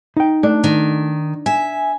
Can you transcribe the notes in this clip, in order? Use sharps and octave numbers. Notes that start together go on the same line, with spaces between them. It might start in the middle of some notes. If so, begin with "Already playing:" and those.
D#4 G5
A3 D4
D#3
E5 G#5